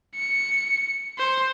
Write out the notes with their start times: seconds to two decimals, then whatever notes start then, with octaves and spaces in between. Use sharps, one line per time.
0.16 C#7
1.18 C5